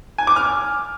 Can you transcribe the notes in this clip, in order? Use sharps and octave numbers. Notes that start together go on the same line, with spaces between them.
G#5
D6
F6